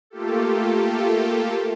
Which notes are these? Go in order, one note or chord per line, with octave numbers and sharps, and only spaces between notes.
A3 A#3 F4 G4 A4